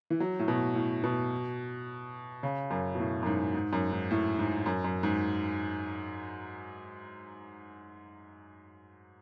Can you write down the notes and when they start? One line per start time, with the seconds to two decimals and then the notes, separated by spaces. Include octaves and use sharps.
0.10 E3
0.20 F#3
0.39 A2
0.48 B2
0.75 A2
1.04 B2
2.43 C#3
2.71 F#2
2.95 B2
2.99 A2
3.23 F#2
3.26 G#2
3.54 G#2
3.73 F#2
3.92 G#2
4.11 A2
4.39 G#2
4.66 F#2
4.84 F#2
5.03 G#2